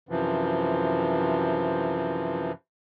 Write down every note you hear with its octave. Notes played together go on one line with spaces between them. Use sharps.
F#2 C3 E3 F3